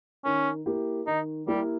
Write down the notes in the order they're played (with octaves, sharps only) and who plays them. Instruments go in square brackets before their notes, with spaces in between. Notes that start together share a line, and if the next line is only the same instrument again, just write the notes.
[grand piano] D#3 [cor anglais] C#4
[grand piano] A#3 E4 G4 A#4
[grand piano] D#3 [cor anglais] D#4
[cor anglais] G3 [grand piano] A#3 E4 G4 A#4